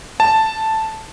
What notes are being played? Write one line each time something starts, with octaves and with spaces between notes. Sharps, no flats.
A5